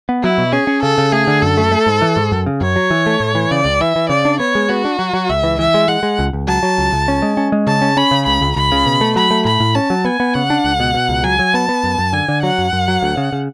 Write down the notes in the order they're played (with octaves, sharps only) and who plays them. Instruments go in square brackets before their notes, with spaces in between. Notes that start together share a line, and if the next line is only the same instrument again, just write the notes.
[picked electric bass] B3
[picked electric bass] F#3 [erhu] E4
[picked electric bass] B2
[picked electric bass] C#4 [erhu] G#4
[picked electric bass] C#4
[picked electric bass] C#3 [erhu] A4
[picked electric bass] C#3
[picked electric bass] A3 [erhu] G#4
[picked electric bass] D3
[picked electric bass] F#2 [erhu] A4
[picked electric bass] A3
A3
G#2
E3
G#2
F#2
C#3
[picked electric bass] F#2 [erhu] C#5
[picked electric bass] F#3
E3
A3
A2
E3
[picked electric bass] C#3 [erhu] D5
[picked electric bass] C#2
[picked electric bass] E3 [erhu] E5
[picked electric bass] E3
[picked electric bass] C#3 [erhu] D5
[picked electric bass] D4
[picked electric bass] B3 [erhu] C#5
[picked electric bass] G#3
[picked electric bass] B3 [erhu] F#4
[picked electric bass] D4
F#3
F#3
[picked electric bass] C#2 [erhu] E5
[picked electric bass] E3
[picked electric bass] E3 [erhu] E5
[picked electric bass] G#3
[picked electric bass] G#3 [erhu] F#5
[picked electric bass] G#3
C#2
C#2
[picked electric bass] F#3 [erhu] A5
[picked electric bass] F#3
C#2
C#2
C#4
G#3
C#4
G#3
[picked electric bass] C#3 [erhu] A5
[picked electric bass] C#4
[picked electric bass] C#4 [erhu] B5
[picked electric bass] C#3
[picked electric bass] C#2 [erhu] B5
[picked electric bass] C#2
[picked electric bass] C#2 [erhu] B5
[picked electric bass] C#3
B2
A3
[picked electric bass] F#3 [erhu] B5
[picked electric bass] A3
[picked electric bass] A2 [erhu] B5
[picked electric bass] A2
[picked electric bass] C#4 [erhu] A5
[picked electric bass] F#3
[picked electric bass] B3 [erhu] G#5
[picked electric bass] B3
[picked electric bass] C#3 [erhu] F#5
[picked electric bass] D4
C#2
B2
B2
C#2
[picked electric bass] F#3 [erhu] G#5
[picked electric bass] F#3
[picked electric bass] B3 [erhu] A5
[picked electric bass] B3
F#2
F#2
[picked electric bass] D3 [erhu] G#5
[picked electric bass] D3
[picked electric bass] F#3 [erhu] F#5
[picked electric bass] F#2
F#2
F#3
D2
C#3
C#3